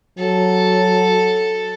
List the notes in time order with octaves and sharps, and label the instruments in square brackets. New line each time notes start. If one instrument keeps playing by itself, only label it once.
[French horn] F#3 [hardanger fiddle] A4